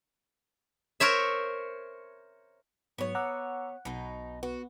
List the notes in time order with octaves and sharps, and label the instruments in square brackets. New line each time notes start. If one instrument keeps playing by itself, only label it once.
[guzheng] A#4 C5 C#5 E5
[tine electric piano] G#2 F#3 [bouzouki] B3 C#5
[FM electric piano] F#5 [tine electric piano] A#5 D6 E6
[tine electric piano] B1 [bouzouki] B2 D#4
[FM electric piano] B3 [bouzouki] F#4